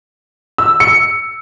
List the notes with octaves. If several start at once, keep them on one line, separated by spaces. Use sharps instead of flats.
E6
C#7